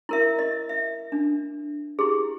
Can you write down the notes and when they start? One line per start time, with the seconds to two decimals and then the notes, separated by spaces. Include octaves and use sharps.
0.09 E4 A#4 E5
0.39 D#5
0.69 E5
1.12 D4
1.99 E4 G4 G#4